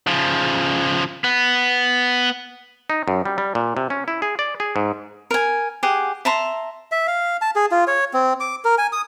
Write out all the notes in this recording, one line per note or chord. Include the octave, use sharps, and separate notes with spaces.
C#3 F3
B3
D#4
F#2
G3
G3
A#2
C3
C#4
E4
G#4
D5
G#4
G#2
A#4 G#5
G4 G#4 F#5
E5 A5 A#5 C6
E5
F5
A5
G#4
F4
C#5
C4
D6
A#4
G#5
D#6